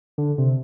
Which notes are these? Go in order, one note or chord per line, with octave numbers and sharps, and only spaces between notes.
D3
C3